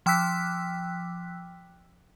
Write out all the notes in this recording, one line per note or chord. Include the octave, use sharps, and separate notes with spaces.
F3 G5 D6 E6 F#6 B6